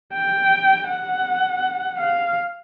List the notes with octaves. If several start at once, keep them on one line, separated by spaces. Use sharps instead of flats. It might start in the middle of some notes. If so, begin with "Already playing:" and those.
G5
F#5
F5